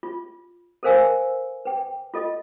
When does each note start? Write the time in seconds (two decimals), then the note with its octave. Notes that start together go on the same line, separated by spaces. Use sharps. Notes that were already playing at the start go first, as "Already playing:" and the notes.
0.03 F4
0.83 A4 A#4 C5 F5 G#5 E6
1.65 B4 G5
2.14 F4 A4 D#5